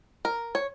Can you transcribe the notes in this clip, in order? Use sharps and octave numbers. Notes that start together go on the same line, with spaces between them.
A#4
C#5